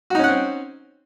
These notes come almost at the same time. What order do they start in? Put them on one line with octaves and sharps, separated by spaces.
F#4 D#4 C#4 F#5 C4